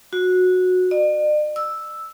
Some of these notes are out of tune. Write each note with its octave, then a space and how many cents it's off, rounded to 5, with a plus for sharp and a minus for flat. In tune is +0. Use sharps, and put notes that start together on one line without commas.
F#4 -15
D5 +45
E6 -5